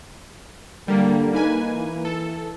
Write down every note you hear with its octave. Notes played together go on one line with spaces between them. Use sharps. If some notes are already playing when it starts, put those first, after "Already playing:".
D3 G3 A#3
A#3 D#4 B4 G#5
E3
A4